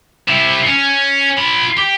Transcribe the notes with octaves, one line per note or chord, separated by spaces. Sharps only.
C3 E4
C#4
F4 B5
G4